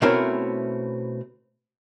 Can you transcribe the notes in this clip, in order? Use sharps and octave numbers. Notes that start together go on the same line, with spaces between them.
B2 A3 C4 C#4 E4 A#4